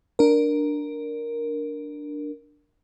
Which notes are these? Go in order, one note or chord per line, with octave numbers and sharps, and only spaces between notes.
D4 A#4